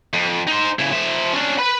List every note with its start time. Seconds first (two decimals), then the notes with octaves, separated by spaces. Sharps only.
0.14 F2
0.47 D#4 C5
0.79 C#3 E4
0.92 F3 E5
1.34 C#4 D4
1.59 B4 B5